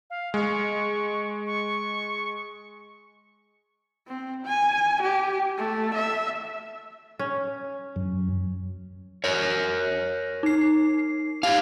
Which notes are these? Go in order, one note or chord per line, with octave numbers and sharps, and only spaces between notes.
F5
G#3 C#6
C#6
C4
G#5
G4
A3
E5
C#4
F#2
A#4 C#5
D#4 C7
A2 D#4 G4 F5 G#6